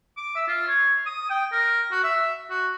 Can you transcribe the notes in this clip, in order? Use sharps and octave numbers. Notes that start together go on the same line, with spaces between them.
D6
E5
F4
C#5
D#6
G5
A#4
F#4
E5
F#4